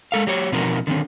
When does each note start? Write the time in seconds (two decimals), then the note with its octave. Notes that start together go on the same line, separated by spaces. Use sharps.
0.12 G#3 A4 F5
0.27 F#3 G4 C#5
0.52 B2 F3 C4 D#4 F#4 A#4
0.87 D3 D#3 G#3 C4